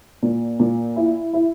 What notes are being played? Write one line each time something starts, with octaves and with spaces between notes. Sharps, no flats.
A#2
A#2
E4
E4